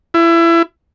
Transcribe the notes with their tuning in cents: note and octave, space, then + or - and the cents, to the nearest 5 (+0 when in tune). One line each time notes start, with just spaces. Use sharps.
E4 +25